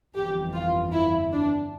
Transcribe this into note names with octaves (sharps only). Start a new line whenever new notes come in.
G1 F2 E3 G4
F4
E4
D4